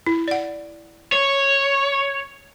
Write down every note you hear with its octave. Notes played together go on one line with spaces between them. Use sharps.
E4
D5 F#5
C#5